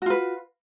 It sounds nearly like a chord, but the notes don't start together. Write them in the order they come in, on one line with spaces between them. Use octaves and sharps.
F#4 F4 B4